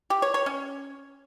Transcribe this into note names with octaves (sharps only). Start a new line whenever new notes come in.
G4
C#5
C#5
C#4